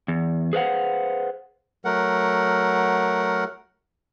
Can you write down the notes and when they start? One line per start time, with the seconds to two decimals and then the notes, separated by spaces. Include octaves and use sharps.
0.08 E2
0.53 G#4 B4 C5 F5 F#5
1.85 F#3 A3 A#4 F#5